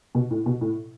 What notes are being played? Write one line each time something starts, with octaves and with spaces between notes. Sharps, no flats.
B2
A2
B2
A2